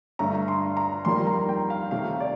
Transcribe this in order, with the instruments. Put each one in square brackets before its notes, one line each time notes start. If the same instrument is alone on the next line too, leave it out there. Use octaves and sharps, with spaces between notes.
[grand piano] G2 D3 A3 A#5
C6
A#5
F2 D#3 G3 A#3 C6
A#5
G5
F5
C3 D#3 A3 F5
D5